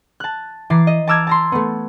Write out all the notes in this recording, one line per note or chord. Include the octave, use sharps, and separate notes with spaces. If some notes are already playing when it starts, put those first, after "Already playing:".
A5 F#6
E3 A#5 D6 A6 C7
D#5
A5 A#5 D6 E6 F6 G#6
A5 A#5 C6
A3 B3